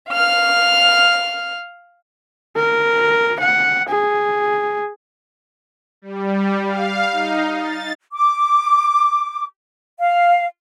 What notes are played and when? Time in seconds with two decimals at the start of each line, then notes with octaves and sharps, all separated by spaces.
0.11 F5 F6
2.56 A#4
3.40 F#5
3.89 G#4
6.02 G3
6.66 F5
7.12 D#4
7.58 A6
8.12 D6
9.98 F5